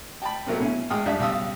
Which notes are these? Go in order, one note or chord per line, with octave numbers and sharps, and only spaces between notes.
G5 A5 B5
A#2 F#3 A3 A#3 C4
B2 C#4 E4
A1 G#3 G5 D#6 F6
F2 G3 D4 E5
B1 C#3 G3 F5 D#6 E6